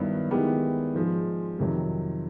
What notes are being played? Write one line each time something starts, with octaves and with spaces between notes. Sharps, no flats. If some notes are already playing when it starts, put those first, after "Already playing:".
Already playing: G2 D#3 F#3 B3 E4
D#3 G#3 B3 E4 G4
G#2 F3 G#3
F2 C3 D#3 F#3